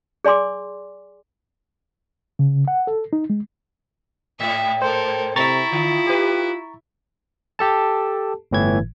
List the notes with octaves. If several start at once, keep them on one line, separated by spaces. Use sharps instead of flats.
G#4 D5 G#5 C6 D6
C#3
F#5
A4
D#4
G#3
G#2 E5
A4 A#4 C5
C3 E4 A#5 C#6 A6
D3 F4
G4 B4
G4 A4 A5
G1 A2 E3 G#6